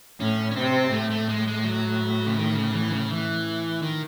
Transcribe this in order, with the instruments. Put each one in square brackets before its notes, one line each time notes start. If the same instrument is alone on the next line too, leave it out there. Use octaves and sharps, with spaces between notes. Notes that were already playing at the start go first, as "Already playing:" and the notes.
[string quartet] A2 [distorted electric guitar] C#4
[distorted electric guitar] C#4
[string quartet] C3 [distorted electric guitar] C4
[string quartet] A2 [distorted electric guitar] A3
[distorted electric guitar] A3
G#3
G#3
F#3
C#3
D#3
C#3
E3
C#3
E3
D#3